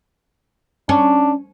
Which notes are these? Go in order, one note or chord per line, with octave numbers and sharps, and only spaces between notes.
C#4 D4